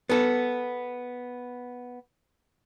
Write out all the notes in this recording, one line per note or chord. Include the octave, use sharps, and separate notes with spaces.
B3 A4